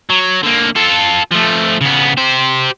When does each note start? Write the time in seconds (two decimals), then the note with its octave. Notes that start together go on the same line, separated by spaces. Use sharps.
0.10 F#3
0.43 D3 A#3
0.76 F4 A4
1.32 F3 A3
1.81 C#3 B3
2.17 G4 C5